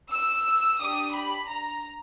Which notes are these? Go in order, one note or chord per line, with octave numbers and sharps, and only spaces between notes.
E6
D4 G4 D#6
B5
A#5